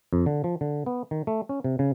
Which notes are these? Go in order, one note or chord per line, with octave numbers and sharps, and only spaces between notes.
F2
D3
F3
D3
B3
D#3
A3
C#4
C3
C#3